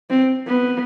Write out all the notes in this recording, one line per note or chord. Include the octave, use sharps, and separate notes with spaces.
C4
B3